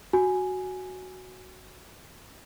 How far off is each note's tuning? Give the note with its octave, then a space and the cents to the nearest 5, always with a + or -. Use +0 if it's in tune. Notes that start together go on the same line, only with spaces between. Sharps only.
F#4 +0 G#5 +0